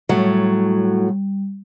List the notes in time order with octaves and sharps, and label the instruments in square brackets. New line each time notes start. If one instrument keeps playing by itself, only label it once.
[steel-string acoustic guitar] A2 F#3 A3 [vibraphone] G3